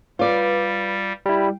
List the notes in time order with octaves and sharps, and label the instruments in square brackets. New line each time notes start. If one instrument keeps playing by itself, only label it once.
[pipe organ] G3 [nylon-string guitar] F4 D5 [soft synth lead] B4
[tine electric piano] G3 E4 [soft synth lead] G5